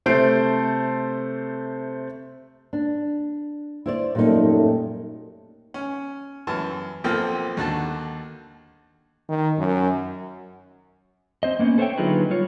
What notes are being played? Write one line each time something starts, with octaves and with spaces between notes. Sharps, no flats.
C3 A3 C5 A5 C7 D7
D4
E4 C5 D5
F#2 A#2 G3 A3 D#4
C#4
F#2 E3 A5
B1 F3 A#3 C4 A4 G5
D#2 D3 F#4 A4 A5
D#3
F#2
C4 C5 D#5
A#3 B3 C#4
A4 C5 C#5 D#5 E5 G5
D3 F#3 D#4 F4 G#4 B4
G3 F4 C#5